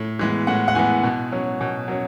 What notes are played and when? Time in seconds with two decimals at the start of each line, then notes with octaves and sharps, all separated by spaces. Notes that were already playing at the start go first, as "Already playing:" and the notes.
Already playing: A2
0.19 E3 G#3 B3
0.47 A2 F#5
0.68 F#5
0.75 E3 G#3 B3 G#5
1.03 B2
1.32 F#3 C#4
1.61 B2
1.88 F#3 C#4